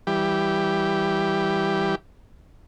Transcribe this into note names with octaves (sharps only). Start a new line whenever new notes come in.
E3 G3 G4